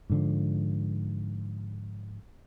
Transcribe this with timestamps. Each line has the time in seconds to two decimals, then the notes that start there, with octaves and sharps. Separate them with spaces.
0.10 G#2 D3 F3